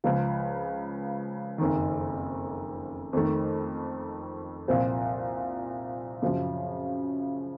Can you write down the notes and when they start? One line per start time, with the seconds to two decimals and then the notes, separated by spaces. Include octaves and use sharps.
0.04 C#2 C#3 F3
1.58 F#1 F2 D#3
3.13 F2 D#3 A3
4.68 C2 A#2 F3 C4
6.22 F#2 C#3 F3